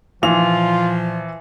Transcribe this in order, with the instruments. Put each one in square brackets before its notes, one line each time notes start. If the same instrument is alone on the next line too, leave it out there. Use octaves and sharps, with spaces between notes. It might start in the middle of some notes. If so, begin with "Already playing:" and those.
[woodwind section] A#2 F3 [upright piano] E3 F7 [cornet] F4